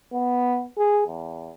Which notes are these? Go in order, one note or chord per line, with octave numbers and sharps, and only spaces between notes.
B3
G#4
E2